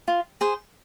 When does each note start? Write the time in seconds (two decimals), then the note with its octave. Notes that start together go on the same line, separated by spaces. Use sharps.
0.08 F4
0.41 G#4 C5